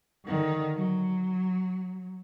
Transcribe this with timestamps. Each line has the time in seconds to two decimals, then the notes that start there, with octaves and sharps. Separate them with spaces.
0.25 D3 D#3
0.76 F#3